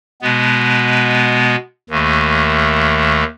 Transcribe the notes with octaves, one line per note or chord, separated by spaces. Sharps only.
B2 G#3 B3
D#2 D#3 A3